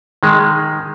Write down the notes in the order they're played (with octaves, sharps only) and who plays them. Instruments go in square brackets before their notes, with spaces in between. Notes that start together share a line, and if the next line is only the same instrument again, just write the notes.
[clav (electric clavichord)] D#3 G#3